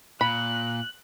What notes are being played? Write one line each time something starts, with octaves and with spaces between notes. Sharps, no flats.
A#2 B5 F#6